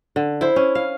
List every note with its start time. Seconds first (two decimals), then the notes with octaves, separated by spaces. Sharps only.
0.16 D3
0.41 E4 C5
0.56 C#4
0.75 F5